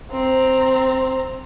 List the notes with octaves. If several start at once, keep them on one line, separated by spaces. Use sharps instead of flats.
C4 A#5